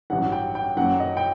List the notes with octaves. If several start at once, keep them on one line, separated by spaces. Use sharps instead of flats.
A1 G2 F#3 F#5
G5
G5
F#2 F#3 A#3 F#5
D#5
G5